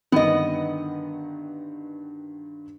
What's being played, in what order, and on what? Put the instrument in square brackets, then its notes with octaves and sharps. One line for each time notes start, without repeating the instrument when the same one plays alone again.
[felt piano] G2 D3 D#3 [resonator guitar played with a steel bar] B3 D#5